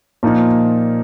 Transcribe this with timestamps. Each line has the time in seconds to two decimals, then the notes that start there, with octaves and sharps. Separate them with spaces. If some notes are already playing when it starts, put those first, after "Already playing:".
0.23 A#2 F3 A#3 D#4